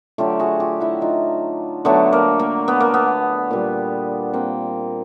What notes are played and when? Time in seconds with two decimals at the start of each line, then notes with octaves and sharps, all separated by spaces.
0.18 D3 F#3 A3 F4 G4
0.39 F#4 G#4
0.60 F4 G4
0.80 E4 F#4
1.01 D#4 F4
1.85 D3 F#3 A3 B3
2.13 A#3
2.39 A#3
2.68 B3
2.80 A#3
2.94 B3
3.51 A#2 G3
4.33 A#3 C4